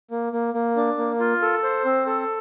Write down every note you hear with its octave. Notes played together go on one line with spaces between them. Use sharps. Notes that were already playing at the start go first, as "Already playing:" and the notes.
A#3
A#3
A#3
D4
A#3
F4
A4
C5
C4
A4